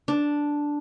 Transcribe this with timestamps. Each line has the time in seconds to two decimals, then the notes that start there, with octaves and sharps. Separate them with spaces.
0.08 D4